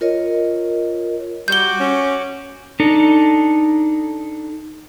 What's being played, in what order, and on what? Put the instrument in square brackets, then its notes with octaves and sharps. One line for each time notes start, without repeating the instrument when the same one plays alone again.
[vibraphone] F4 A#4 C#5 D#5
[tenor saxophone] G3 [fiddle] F#4 D6 [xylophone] G6 G7
[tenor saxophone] C#4
[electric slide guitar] D4 D#4 A4